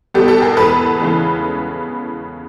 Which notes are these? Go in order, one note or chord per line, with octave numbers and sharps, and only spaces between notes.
B2 G3 B3 G4 A4
G4 A4
G#4 A#4
E2 B2 G#3 B3 A4 B4
C#3 E3 G#3 B3